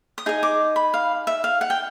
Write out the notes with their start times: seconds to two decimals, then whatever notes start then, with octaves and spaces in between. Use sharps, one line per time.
0.18 D#6
0.26 D#4 G#4 D#5
0.43 D6
0.76 B5
0.94 F5
1.27 E5
1.44 F5
1.61 F#5
1.70 G5